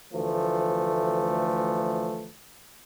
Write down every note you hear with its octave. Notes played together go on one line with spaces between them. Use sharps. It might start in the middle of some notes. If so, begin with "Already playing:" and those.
D2 E3 F3 A3